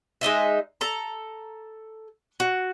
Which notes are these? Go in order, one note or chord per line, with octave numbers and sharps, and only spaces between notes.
G#3 D#4 D#5 E5
A4 A#5
F#4